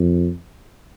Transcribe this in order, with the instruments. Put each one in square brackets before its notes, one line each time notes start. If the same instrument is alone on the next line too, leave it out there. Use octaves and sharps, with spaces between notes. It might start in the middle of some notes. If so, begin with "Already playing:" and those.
Already playing: [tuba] F2